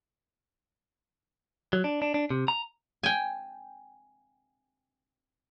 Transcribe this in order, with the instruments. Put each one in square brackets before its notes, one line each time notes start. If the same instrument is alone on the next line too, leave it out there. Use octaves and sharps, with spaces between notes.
[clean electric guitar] F#3
D4
D4
D4
C3
A#5
[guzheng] G5 G#5